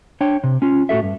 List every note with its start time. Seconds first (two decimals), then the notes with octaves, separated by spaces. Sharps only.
0.21 D4 C#5 G5
0.44 C3
0.62 C#4 F4
0.89 A2 F#4 A4 E5
1.03 G2